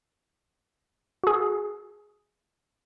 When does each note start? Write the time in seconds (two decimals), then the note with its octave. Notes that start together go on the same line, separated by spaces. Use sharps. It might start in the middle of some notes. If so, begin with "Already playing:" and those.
1.24 F#4 G#4